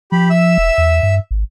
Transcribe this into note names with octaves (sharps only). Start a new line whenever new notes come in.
F3 G4 B5
E5 E6
E1
E2
G2
G#1